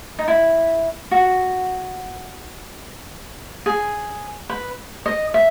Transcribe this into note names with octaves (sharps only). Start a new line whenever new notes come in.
D#4
E4
F#4
G#4
B4
D#5
E5